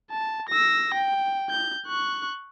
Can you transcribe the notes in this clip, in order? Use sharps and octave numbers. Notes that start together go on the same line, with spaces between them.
A5
E6 A#6
G5
G6
C#6 F#6